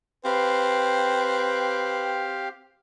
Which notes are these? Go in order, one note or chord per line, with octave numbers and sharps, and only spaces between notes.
C4 G4 B4 F5